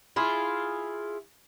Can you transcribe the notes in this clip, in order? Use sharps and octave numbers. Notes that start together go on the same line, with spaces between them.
E4 F4 G#4